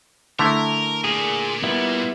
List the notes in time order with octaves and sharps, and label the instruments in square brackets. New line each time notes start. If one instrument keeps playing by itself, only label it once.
[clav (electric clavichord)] D3 A3 E4 [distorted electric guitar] A#4
[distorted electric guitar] A#2 [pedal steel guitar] G#4
[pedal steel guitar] G3 B3 E4